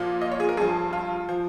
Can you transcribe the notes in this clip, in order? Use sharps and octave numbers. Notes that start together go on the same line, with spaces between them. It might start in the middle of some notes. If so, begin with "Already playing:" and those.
Already playing: A#2 F3
D#5
C#5
G#4
A#4
G2 F3 G#4
F4
F3